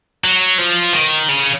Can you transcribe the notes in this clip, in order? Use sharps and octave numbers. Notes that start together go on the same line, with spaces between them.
F#3
F3
D#3
C#3